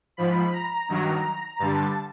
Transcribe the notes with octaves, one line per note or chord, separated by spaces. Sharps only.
G#2 F3 B5
A#5
G2 D#3 F#3
G2 D3 G3 A5